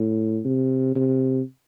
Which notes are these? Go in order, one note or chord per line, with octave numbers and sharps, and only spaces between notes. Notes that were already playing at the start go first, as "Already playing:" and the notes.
Already playing: A2
C3
C3